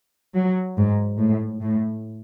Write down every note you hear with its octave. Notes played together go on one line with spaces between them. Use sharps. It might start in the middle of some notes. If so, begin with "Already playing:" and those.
F#3
G#2
A2
A2